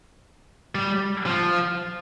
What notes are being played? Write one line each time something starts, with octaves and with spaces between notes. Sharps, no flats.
G3
F3